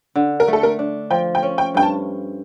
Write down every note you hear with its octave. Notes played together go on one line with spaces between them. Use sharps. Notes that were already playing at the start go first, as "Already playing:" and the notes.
D3
A#4
A3
A4
A#4
D4
F3 G5
G5
C#4
G5
G2 G5
A5